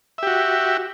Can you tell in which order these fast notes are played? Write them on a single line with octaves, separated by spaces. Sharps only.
E5 G4 F#4